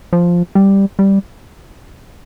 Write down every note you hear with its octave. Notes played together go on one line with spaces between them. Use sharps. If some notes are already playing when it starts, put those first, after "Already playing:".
F3
G3
G3